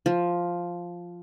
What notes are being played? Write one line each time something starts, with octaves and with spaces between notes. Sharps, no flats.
F3